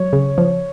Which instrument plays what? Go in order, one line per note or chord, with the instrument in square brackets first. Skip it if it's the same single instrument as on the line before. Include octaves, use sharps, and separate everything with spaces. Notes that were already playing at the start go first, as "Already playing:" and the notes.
Already playing: [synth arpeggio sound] F#3 [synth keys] C#5
[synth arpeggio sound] C#3
F3